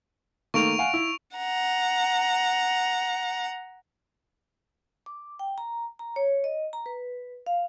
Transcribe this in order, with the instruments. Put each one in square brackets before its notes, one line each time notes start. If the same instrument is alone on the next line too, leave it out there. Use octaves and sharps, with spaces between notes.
[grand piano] D#3 A3 A#3 [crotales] C#6 D7 F7
[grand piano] F5 F#5 G#5
E4
[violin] F#5 A#5
[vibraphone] D6
G5
A#5
A#5
C#5
D#5
A#5
B4
F5